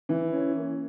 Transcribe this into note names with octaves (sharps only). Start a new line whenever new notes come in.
E3
C#4
A#3